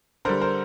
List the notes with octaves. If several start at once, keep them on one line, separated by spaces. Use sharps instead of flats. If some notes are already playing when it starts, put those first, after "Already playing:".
D3 G3 A#4 C5
A#4 C5